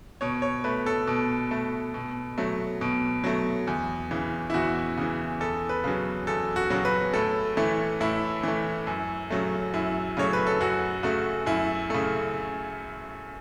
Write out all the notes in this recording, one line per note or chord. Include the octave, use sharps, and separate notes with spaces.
B2 C#5
C#5
A3 B4
A4
B2
A3
B2
F#3 A3
B2
F#3 A3
E2
C#3 E3
E4
E2 F#4
C#3 E3
E2 A4
B4
C#3 F#3
E2 A4
F#4
C#3 F#3
B4
A2 A4
E3 A3
A2 E4
E3 A3
F#2
C#3 F#3 A3
F#2 E4
C#3 F#3 A3 C#5
B4
A4
F#2 F#4
C#3 A3 F#4
F#2 E4
C#3 A3